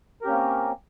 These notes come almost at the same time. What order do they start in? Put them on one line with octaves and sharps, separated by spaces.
A#4 G4 C#4 A#3 C4